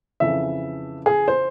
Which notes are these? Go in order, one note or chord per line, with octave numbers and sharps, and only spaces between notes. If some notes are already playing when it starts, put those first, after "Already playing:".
F2 C#3 E3 E5
G#4
C5